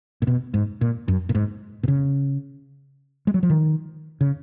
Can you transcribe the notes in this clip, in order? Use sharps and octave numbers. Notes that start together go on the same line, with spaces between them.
A#2
B2
G#2
A#2
F#2
A#2
G#2
B2
C#3
G#3
F#3
F3
D#3
C#3